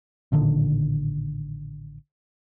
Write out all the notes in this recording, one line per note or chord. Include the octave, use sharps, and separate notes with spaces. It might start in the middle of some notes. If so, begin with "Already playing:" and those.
A1 A#2 D3 D#3